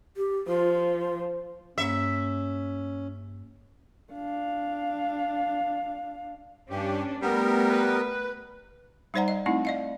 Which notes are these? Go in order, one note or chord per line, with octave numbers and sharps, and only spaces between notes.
G4
F3 F4
G2 A#3 C#4 E5
D4 F5
G2 C#4 D4 G4
G3 A3 B3 A#4
B4
G3 D#4 C5 D5 F#5 A#5
D#5
A3 C4 D#4 E4
D5 D#5 F5